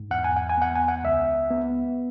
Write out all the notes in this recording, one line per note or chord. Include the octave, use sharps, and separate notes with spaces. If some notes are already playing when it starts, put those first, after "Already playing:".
Already playing: G#2
E2 F#5
G#5
F#5
G#5
B3 F#5
G#5
F#5
C#2 E5
B3